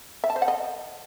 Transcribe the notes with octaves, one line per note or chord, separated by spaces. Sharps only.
E5
A5
C5
F#5
D#5